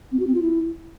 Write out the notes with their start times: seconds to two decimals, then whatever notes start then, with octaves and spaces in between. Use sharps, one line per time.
0.12 C4
0.19 F#4
0.27 C4
0.34 F4
0.42 E4